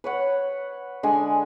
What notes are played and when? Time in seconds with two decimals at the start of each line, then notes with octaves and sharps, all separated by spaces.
0.04 B4 C#5 F#5
1.03 D3 G#3 G#5